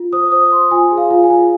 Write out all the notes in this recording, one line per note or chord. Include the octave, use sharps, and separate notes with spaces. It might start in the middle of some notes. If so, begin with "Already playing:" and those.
Already playing: F4
C5 D#6
C5 D#6
C5 C6
F4 G#5
G#4
F5
F4
G#5
F4